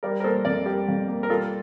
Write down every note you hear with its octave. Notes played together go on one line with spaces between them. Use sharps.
G3 A#4 D5
A#4
A#3 A4 C5
F2 A#4 D5
G3 G4 A#4
F2
A#3
A#4
G3 F4 A4